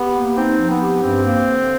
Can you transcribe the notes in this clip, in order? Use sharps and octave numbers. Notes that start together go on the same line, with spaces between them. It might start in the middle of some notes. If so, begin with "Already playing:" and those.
Already playing: B3 G4
A#3
C4 D#4
F3
B3
G4
G2 C4
A#3
D3